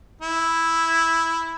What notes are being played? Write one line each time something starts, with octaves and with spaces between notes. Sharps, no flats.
E4